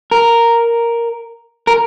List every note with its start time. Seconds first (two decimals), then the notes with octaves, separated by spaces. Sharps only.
0.12 A#4
1.67 A#4